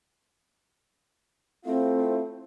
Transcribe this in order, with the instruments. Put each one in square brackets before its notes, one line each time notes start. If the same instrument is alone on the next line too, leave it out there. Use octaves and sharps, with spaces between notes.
[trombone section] A3 E4 F4 [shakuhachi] C4